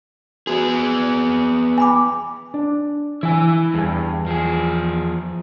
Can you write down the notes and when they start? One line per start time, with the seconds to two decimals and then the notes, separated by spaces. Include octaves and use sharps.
0.47 B3 F#4 G#4
1.78 G#5 B5 D6
2.54 D4
3.23 E3 E4 G#5
3.74 E2 G2 G#5
4.27 F3 G#4